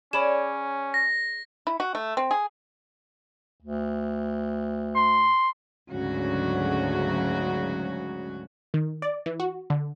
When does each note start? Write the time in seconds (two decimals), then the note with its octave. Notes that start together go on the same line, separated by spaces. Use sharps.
0.13 C#4 G#4 C#5 D5 B5 E7
0.94 A#6
1.67 E4
1.80 F#4
1.95 A3
2.17 C4
2.31 G#4
3.62 D2
4.95 C6
5.90 D2 G#2 C#3 F#3 F#4
8.74 D#3
9.02 D5
9.26 E3
9.40 F#4
9.70 D3